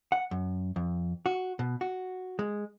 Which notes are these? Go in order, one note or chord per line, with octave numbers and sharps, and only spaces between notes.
F#5
F#2
F2
F#4
B2
F#4
G#3